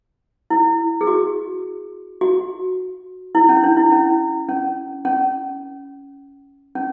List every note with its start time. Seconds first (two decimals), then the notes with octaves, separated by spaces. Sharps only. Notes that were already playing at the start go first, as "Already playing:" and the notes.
0.50 E4
1.01 G#4
1.07 F#4
2.21 F#4
3.35 E4
3.49 C#4
3.64 D4
3.77 E4
3.92 C#4
4.49 C#4
5.05 C#4
6.75 C#4